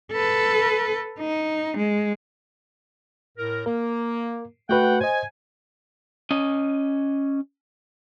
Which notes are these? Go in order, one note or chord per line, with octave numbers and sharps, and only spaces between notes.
A4 B4
D#4
G#3
A2 A#4
A#3 A#4
A3 F#4 B4 F#5 G5
C5 D#5 G#5
C#4 D#5